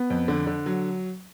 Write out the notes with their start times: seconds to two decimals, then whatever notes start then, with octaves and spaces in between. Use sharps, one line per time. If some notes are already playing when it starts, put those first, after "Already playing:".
Already playing: B3
0.10 F2
0.28 D3
0.47 D3
0.66 F#3